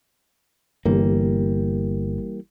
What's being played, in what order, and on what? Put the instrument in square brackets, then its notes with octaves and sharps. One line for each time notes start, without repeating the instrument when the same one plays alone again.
[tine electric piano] G1 [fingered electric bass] E3 G3 A#3